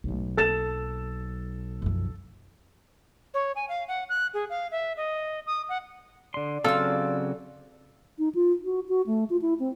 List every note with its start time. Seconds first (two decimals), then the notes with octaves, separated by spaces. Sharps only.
0.04 B1 G#2 A3
0.37 A#3 A4 A6 E7
1.82 F#2 F3
3.34 C#5
3.56 G#5
3.69 F5
3.88 F#5
4.09 F#6
4.34 G#4
4.50 F5
4.71 E5
4.97 D#5
5.47 D#6
5.69 F#5
6.34 D3 D5 C6
6.64 C#3 F#3 C4 F4 A4 E6
8.19 D#4
8.35 F4
8.64 F#4
8.89 F#4
9.07 A3
9.30 F4
9.42 E4
9.60 C4